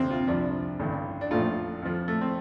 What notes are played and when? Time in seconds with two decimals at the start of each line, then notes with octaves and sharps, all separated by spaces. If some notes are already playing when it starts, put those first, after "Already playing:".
Already playing: D2 C3 F3 C4
0.11 F4
0.27 C2 C3 F3 D4
0.79 A1 G2 D3
1.21 D4
1.31 A1 A2 F3 F4
1.82 F2 F3
2.08 A3
2.21 C4